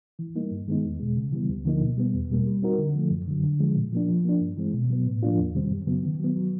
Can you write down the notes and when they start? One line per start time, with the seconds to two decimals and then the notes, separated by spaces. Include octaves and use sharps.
0.19 E3
0.35 G3 A#3 D#4
0.51 G2
0.68 D#3 G#3 B3 D#4
0.84 E2
1.00 B2 G#3
1.16 C#3
1.33 E3 G3 B3
1.49 D2
1.65 D3 F3 A#3 D#4
1.81 B2
1.97 G3 B3
2.14 E2
2.30 B2 G3 A#3
2.46 G3
2.62 C4 D#4 F#4 A#4
2.78 D3
2.95 F3 A3
3.11 F#2
3.28 D3 F#3
3.44 D3
3.60 F3 G#3
3.76 A#2
3.92 F3 A#3 D4
4.08 F3
4.25 A#3 D4
4.41 G2
4.57 E3 G#3 C4
4.74 B2
4.90 F#3 B3
5.06 A2
5.23 F3 A#3 D4 F4
5.38 E2
5.55 C3 D#3 G3 C4
5.71 F#2
5.87 C#3 F#3 B3
6.03 D#3
6.19 F#3 B3
6.36 F#3